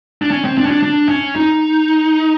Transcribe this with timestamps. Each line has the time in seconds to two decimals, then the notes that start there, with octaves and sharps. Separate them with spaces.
0.22 D4
0.31 C#4
0.45 C4
0.58 D4
0.65 C#4
0.71 D4
0.83 D4
1.09 C#4
1.36 D#4